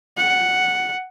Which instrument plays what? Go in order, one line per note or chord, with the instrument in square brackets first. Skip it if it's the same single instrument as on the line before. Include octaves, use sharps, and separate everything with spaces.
[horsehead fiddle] F#5